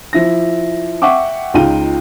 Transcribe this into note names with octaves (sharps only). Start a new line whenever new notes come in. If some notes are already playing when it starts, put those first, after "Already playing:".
F3 E4 A#6
E5 F#5 G5 C#6 D6
C#2 D#4 F4 G5 D#7